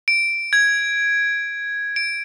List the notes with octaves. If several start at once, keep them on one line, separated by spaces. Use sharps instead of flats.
D7
G#6
D7